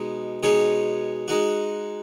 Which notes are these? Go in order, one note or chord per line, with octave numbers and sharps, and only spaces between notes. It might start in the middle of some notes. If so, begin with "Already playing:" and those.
Already playing: B2 G#3 D#4
B2 G#3 D#4 G#4 C#5
G#3 D#4 F#4